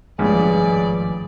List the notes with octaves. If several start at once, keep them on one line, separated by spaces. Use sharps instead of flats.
G#1 C#2 G2 F3 A3 G#4 B4 D5